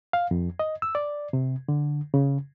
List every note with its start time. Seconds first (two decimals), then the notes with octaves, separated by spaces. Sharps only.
0.13 F5
0.31 F2
0.59 D#5
0.82 E6
0.95 D5
1.33 C3
1.69 D3
2.14 C#3